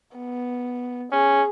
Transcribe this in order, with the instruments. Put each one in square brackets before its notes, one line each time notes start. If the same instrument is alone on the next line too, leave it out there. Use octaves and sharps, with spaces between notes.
[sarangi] B3
[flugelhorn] C#4 [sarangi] G#4